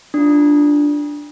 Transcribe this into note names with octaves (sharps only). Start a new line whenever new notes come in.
D4 F4